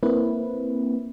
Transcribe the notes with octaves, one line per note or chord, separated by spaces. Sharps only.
A#3 C4 E4 B4